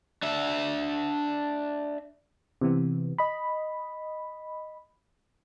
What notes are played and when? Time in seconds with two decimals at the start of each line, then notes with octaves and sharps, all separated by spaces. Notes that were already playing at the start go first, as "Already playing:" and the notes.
0.23 D4 E5
2.61 C3 E3 B3
3.18 D#5 B5